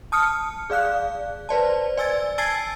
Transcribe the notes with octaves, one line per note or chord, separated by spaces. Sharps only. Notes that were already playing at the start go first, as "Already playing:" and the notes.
A5 D#6 F6 C#7
G#4 D5 F5 F#6
B4 C5 D5 A5
D5 G#5 E6 G#6 A6
G#5 A5 E6 G#6 A6 C7